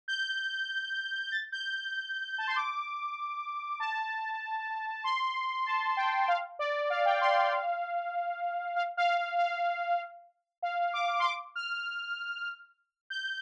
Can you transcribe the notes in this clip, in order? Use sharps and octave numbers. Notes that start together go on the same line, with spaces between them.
G6
A6
G6
A5
C6
D6
A5
C6
A5
G5
F5
D5
F5
G5
C6
F5
F5
F5
F5
F5
F5
D6
C6
D6
F6
G6